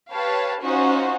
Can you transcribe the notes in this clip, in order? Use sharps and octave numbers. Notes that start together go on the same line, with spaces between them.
G4 B4 C#5 F5 A5
C#4 D#4 F4 F#4 C5